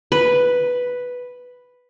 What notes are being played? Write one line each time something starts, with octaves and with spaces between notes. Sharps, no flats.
B4